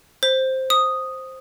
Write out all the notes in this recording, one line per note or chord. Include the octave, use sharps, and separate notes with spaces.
C5
D#6